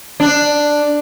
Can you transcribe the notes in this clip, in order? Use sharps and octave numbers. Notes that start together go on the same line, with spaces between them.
D4